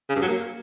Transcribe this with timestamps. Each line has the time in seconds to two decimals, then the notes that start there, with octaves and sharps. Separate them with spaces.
0.09 C#3
0.15 G2
0.22 F#3
0.28 A#3